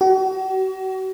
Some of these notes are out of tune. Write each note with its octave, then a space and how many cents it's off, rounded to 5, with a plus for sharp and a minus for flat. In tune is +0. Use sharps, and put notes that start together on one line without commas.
F#4 +40